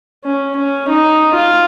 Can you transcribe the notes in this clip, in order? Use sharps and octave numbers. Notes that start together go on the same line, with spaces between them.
C#4
C#4
D#4
F4